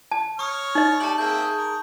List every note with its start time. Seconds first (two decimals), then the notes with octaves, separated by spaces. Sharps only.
0.11 A5
0.39 C#5 A#5 C#6 D#6 F6
0.75 D#4 D#5
1.00 A3 G4 D5 A5 F#7
1.18 A#3 C4 G#4 E5 G6
1.57 A#4